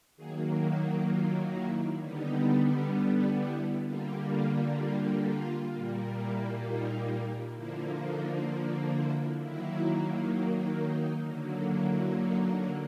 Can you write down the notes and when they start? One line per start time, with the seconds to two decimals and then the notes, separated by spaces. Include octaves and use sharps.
0.16 D#3 F#3 A#3 G#4
0.62 F#4
1.08 F4
1.55 E4
2.00 D3 G3 B3 D#4
3.39 E4
3.86 D3 G3 A#3 F4
4.32 F4
4.78 F4
5.25 F4
5.70 A#2 G3 A#3
6.16 E4
6.63 D#4
7.55 D3 F3 A#3 E4
8.02 D#4
8.94 E4
9.39 D#3 F#3 A#3 E4
10.78 D#4
11.24 D3 F#3 A#3
11.71 E4
12.17 D#4